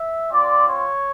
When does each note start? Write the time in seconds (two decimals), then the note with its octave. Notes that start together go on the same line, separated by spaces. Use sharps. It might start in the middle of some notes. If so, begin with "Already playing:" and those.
Already playing: E5
0.31 C4 F4 D5
0.68 C#5